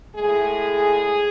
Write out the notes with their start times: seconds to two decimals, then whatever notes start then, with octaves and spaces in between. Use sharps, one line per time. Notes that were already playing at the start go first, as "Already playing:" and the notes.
0.15 A2 G#3 G#4